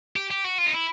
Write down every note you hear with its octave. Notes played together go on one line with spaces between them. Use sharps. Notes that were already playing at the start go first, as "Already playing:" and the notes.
G4
G4
F#4
F4
D#4
E4